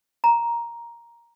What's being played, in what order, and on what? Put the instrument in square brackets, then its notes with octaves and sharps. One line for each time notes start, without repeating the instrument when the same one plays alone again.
[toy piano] A#5